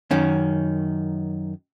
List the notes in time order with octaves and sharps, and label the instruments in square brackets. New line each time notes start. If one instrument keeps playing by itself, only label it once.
[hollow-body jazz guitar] F#2 D#3 C#4